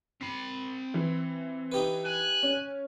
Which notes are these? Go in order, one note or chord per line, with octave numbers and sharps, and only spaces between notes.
C4 B5 C7
E3
D#4 G4 B4
G#5 F#6
C#4